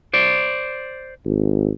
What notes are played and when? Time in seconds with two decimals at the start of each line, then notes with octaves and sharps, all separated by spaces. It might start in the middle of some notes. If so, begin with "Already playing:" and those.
0.14 C5 D5
1.26 G#1